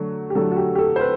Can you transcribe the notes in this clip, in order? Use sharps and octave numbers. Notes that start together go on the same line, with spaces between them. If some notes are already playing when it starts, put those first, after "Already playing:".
Already playing: D3 F#3 A3
G4
D3 F#3 A3 A4
F#4
G4
G4
A4
C5
B4